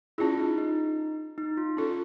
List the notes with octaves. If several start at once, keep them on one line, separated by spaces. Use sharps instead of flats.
C#4 E4 F4 G#4
D#4
D#4
D#4
F4
C#4 F4 A4